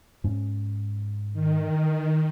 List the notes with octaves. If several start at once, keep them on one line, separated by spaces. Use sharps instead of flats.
G#2 C#4
D#3